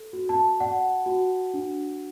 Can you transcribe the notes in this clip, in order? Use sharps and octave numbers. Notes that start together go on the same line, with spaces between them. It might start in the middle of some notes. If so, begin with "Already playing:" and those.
Already playing: A4
F#4
A5
D5 F#5
F#4
D4